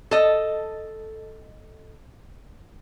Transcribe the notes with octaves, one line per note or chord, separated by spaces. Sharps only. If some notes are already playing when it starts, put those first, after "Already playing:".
A4 D#5